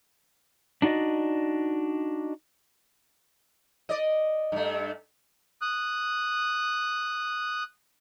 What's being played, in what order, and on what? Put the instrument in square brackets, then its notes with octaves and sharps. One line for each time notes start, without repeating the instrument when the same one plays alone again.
[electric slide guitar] D4 D#4 F#4 D5 D#5
[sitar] D5 D#5
G2 A3
[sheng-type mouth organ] D#6 F#6